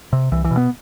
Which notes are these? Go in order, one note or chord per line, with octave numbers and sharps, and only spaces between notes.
C3
C2 E3
E3
B2
B3